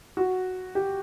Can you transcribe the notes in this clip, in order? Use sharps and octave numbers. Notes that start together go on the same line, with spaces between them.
F#4
G4